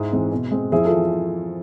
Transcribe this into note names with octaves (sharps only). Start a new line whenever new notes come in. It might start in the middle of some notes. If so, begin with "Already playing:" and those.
Already playing: G#2 E4 G#4
E3 G#3 C4
B2
G#3 C4
F2 E4 G#4
F4 A4
E3